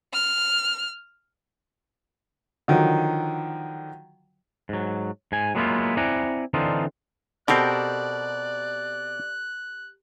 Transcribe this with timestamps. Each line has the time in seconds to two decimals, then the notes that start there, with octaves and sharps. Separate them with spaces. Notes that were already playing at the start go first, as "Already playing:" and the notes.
0.13 F6
2.68 D3 D#3 F3 F#3
4.69 G#2 F#3
5.32 G#2 G#5
5.55 F#3 G#3 A#3 B3 E4 F4
5.97 C4 E4 D5 F#5 G#5 A#5
6.54 D3 E3 C4 D4 D#4 F4
7.48 B2 C4 G4 A4 A#4 D5 F#6